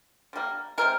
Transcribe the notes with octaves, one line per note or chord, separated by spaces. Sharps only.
D3 G3 A#3
C3 F3 G#3 A#4